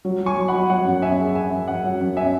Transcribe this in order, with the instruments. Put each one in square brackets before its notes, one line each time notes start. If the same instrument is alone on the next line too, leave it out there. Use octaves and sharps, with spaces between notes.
[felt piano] F#3
F#3
[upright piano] G#5 C#6
[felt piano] F#3
[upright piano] F#5 B5
[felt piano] F#3
[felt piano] F#3 [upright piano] F#5
[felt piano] F#2
[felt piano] C#4 [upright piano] E5 G#5
[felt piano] G#4
[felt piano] G#4 [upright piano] E5 G#5
[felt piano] F#2
[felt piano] F#2 [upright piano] F#5
[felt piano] F#3
F#2
[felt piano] C#4 [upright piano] E5 G#5